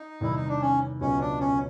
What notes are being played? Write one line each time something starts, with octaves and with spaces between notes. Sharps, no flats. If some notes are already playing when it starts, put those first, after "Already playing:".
Already playing: D#4
E2 C3 D#3 G3 E4
D#4
D4
C#4
C#2 B2 F#3 C#4
D4
C#4